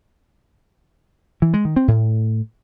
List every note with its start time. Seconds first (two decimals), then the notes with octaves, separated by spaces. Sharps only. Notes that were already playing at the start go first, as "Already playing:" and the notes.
1.42 E3
1.54 G#3
1.65 D#3
1.76 C4
1.88 A2